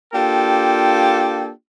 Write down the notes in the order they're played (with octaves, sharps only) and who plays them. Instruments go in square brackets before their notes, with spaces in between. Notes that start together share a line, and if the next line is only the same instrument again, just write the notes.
[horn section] A#3 D4 F4 G4 A4 G5